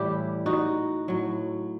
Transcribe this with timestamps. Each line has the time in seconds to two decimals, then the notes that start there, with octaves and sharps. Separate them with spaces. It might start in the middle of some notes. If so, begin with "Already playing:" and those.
Already playing: A2 E3 G3 E4 G4
0.46 D#4 F#4
1.08 A2 F#3